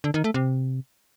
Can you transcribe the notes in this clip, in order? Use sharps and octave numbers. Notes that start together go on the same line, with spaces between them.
D3
D#3
A3
C3